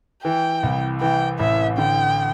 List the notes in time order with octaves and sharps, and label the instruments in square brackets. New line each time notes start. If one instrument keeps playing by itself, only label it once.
[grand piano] E3 [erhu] G5
[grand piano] C2
[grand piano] E3 [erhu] G5
[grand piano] A1 [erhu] E5
[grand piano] D3 [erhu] G5